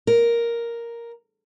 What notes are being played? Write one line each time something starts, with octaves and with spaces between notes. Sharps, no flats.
A#4